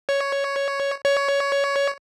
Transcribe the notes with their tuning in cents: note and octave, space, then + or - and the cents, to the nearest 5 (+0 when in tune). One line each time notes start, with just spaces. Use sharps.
C#5 +5
C#5 +15